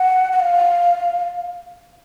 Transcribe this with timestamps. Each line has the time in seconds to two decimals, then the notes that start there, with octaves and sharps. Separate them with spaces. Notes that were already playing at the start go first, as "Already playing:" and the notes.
Already playing: F#5
0.32 F#5
0.40 F5